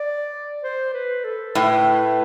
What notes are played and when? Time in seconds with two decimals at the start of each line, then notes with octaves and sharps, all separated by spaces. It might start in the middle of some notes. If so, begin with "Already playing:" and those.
Already playing: D5
0.63 C5
0.94 B4
1.24 A4
1.55 A2 B4